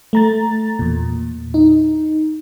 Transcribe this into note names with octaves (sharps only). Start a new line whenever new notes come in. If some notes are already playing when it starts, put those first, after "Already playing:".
A3 A#5 A6
E2 A#2
D#4